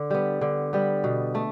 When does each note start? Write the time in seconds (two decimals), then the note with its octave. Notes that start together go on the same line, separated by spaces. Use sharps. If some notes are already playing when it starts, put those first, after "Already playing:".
Already playing: D3
0.10 G3 B3
0.41 D3
0.73 G3 B3
1.04 B2
1.35 A3